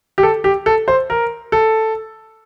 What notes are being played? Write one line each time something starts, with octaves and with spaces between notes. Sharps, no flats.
G4
A4
G4
A4
C5
A#4
A4